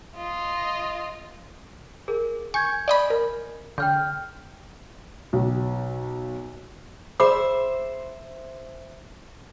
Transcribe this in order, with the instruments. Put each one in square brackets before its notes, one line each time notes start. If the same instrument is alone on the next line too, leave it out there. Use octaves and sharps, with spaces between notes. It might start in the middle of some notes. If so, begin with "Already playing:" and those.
[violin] F4 D#5
[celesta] G#4 A#4
[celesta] G#5 G6 G#6 [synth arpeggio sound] C#6
[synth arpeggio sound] D5 D#5 B5
A#4
[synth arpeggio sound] D3 [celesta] G5 F6 G6
[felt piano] B1
[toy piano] G#4 B5 D6 [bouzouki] C5 E5